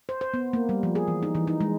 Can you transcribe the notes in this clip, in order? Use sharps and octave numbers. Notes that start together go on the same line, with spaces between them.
C5
C5
B3
A#3
G3
F3
G#4
E3
D#4
E3
D#4
G#3